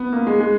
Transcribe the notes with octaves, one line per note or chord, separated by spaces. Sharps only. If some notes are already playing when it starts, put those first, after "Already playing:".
Already playing: B3
A#3
G#3
G#3